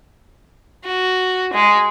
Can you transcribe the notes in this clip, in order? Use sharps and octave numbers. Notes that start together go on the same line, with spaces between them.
F#4
G#3